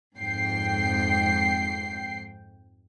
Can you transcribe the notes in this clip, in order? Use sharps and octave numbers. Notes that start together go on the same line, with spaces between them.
F2 G#2 G5 C7